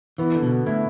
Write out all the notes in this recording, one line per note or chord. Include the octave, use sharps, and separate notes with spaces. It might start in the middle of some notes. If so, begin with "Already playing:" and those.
E3 B3
D3
B2
D3
A2 E4